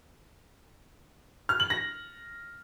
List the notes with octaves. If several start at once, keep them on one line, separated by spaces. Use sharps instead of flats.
F6
F#7
A#6